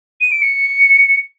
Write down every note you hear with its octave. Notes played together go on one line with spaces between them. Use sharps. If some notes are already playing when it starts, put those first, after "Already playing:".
D#7
D7
C#7